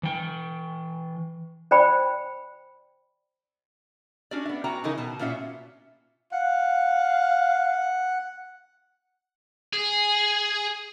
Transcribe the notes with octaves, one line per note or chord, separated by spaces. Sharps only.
E3 G5
C5 D5 G5 B5
C#4 D4 F#4 G4 D5
B3 E5
B3 C#4 F#4 G5 A#5
C#3 E3 D#4 A#4
B2 A5
A#2 B3 C#4 F4 F#4 E5
F5 F#5
G#4